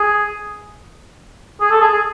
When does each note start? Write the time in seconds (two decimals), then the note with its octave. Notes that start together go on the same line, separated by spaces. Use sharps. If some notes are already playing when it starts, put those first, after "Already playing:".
Already playing: G#4
1.61 G#4
1.71 A4
1.81 G#4
1.92 G#4